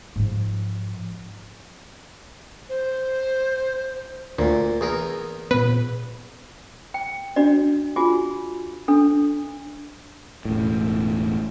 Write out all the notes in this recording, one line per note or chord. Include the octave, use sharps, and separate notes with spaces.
G#2 F3
C5
D2 A#2
E2 G#4 A#4
A#2 B3 B4
G5
D4 F#4 D5
F4 F#4 G#4 G#5
D4 A4
E1 A2